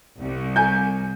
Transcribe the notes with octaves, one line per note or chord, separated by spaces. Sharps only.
C2
G#5 G6